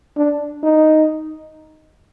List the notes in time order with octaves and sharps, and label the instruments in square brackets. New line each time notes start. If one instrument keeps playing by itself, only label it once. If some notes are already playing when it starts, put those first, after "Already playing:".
[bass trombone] D4
D#4